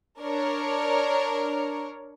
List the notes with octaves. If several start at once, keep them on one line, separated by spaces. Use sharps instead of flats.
D4 A#4 C#5